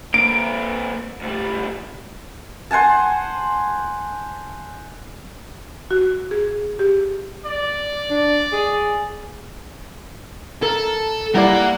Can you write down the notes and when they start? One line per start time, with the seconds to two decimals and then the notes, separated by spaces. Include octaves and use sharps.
0.14 A#3 C4 D7
1.21 D2 G3
2.71 C5 F#5 G#5 A5
5.91 F#4
6.31 G#4
6.79 G4
7.45 D5
8.11 D4
8.53 G#4
10.63 A4 A#4
11.35 G3 A#3 E4 A#4 D5 F#5